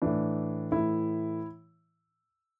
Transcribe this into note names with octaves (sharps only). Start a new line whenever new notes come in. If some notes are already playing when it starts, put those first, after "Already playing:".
A2 E3 D4
A2 E3 E4